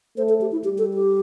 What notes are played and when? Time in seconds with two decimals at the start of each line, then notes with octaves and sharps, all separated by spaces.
0.17 A3 C5
0.29 A4
0.41 G4
0.52 E4
0.64 G3 G4
0.78 A4
0.94 G4